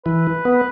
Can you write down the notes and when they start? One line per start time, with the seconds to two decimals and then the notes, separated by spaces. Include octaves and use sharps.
0.05 E3 B4
0.45 B3